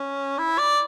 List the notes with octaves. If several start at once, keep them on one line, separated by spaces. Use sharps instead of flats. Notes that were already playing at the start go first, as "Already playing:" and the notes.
Already playing: C#4
E4
D5